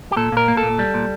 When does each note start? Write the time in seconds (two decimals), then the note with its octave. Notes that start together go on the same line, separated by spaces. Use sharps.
0.12 G4
0.16 A#2 A4
0.32 A#2 A#4
0.48 A#3
0.57 A4
0.63 A#2
0.79 G3
0.94 A#2